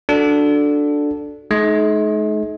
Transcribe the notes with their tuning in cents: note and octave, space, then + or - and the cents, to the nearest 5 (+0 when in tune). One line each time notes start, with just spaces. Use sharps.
D4 +0 F#4 -15 A4 +0
G#3 +45 D#4 +0